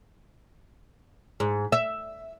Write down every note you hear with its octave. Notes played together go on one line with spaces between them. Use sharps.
G#2
E5